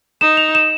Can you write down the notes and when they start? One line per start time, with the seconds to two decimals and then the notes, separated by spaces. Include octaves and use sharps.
0.21 D#4 E7
0.37 F7
0.55 E7